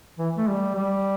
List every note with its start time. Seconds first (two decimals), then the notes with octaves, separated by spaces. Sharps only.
0.19 E3
0.38 A3
0.48 G3
0.75 G3